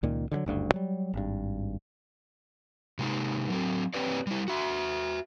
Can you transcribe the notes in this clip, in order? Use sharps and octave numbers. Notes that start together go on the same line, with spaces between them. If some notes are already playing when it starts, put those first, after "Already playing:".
C#2 A#2 D#3
D3 E3 F#3
F#1 D2 G2
F#3 G3
G#1 G2
C3 G#3 D#4
F#3 C4
C4 G4 B4 C#5 D5
G3 E4
F#4 E5